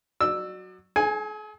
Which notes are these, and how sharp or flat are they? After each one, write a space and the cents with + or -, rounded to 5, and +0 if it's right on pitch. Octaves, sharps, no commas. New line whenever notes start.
F#3 +0 D5 +40 E6 +0
G#4 +45 G#5 +0